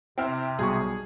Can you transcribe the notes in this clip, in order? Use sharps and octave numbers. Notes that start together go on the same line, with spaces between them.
C3 C4 E4 F6
B1 G3 G#4 C#6